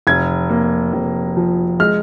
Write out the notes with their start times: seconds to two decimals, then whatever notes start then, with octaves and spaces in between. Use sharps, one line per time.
0.07 F1 G#6
0.50 A#3
0.93 F1
1.37 F3
1.80 G#3 F6